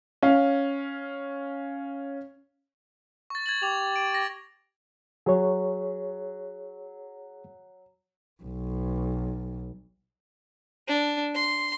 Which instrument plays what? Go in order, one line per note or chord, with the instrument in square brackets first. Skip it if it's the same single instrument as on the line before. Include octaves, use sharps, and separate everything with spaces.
[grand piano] C#4 F5
[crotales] C#6 A6
G#6 A6 F#7
[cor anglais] G4 [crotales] F7
[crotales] D7
A#6
[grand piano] F#3 [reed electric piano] G#4 C#5
[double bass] B1
[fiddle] D4
C6